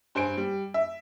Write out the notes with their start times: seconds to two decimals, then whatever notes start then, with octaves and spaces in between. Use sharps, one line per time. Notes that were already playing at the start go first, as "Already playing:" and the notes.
0.15 G2 C5 G#5 D7
0.37 G3
0.74 E5